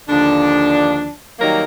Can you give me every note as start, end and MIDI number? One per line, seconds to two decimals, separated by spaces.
0.09 1.10 39
0.09 1.10 50
0.09 1.10 53
0.09 1.10 62
1.40 1.63 51
1.40 1.63 54
1.40 1.63 55
1.40 1.63 58
1.40 1.63 63
1.40 1.63 70